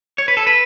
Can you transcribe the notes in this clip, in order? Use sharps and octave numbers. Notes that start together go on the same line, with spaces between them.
C#5
B4
A4
B4